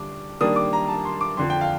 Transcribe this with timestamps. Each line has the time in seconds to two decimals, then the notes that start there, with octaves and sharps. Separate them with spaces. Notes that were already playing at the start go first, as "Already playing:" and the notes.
Already playing: D3 G3 D4 D6
0.41 D#3 G3 A#3 D4 D#6
0.56 D6
0.73 A#5
0.88 A5
1.05 C6
1.21 D6
1.37 F2 D3 F3 C6
1.50 G5
1.61 F5